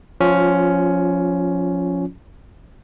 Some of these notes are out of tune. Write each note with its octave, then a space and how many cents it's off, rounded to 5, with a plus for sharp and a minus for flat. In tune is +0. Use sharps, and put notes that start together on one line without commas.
F3 +25 C#4 +10 F4 +0